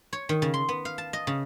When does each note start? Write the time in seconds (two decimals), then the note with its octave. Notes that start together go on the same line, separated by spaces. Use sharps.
0.13 C#5
0.29 D#3
0.42 C#3
0.54 C6
0.69 B3
0.85 F5
0.98 A5
1.13 D#5
1.27 C#3